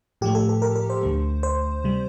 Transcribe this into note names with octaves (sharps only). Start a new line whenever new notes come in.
A2 F3 A3 G4
A4
A4
A#4
A#4
C5
D2 D3 A3
C5
C3 G3